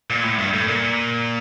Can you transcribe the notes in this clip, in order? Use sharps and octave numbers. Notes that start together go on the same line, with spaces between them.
A#2
A2
G2
A2
A#2